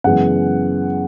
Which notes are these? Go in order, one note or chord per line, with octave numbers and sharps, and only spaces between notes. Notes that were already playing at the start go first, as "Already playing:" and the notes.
F#2 C#3 E3 G#3 B3 F#5